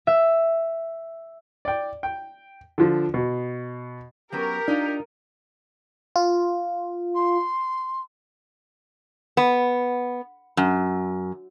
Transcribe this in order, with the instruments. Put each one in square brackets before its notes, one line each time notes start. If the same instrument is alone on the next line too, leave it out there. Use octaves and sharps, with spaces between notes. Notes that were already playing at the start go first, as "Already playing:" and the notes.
[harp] E5
[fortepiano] D5 G5
G5
D3 F3
B2
[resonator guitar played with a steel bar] F#3 B3 C#4 [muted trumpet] G4 [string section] A#4
[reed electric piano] D4 [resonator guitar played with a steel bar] D#4 F4
[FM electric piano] F4
[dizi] C6
[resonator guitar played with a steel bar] B3
F#2